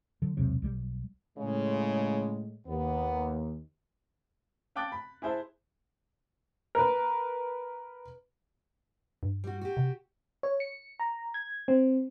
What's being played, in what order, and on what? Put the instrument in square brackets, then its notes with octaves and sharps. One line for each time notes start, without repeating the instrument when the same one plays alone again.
[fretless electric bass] D3 F#3
E1 B1 C3 F#3
B1 G3
[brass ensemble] A2 G#3 [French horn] C#3
[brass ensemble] D#2 [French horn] B3
[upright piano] F5 G5 A5 D6 F#6 A6
B5
E4 G#4 C5 E5 A5
[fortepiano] A#4 B4
[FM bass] G2
[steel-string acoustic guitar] G3 F#4
F#4 G4
[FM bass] C3
[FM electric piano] C#5
C#7
A#5
G#6
C4